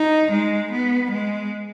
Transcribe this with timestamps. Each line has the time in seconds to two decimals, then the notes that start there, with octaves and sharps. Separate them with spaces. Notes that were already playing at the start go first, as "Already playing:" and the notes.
Already playing: D#4
0.32 G#3
0.72 B3
1.12 G#3